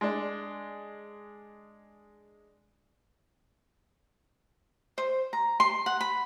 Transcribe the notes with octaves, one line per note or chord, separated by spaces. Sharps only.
G#3 D4
C5
A#5
C6
F#5
B5